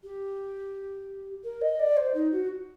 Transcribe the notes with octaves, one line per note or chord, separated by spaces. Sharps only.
G4
A#4
D#5
D5
C5
D#4
F#4